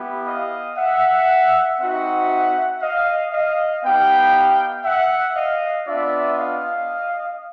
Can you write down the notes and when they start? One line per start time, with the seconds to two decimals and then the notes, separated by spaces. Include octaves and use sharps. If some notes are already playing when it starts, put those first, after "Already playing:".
Already playing: B3 E4 G4
0.26 D#5 F5
0.77 E5 F#5
1.79 C4 D#4 F#4 E5 F#5
2.81 D#5 F5
3.32 D#5 F5
3.83 B3 D#4 G4 F5 G5
4.84 E5 F#5
5.35 D#5 F5
5.86 B3 D4 F4 D5 E5
6.37 D#5 F5